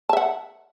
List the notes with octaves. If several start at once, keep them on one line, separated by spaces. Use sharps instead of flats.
E5 F#5 A5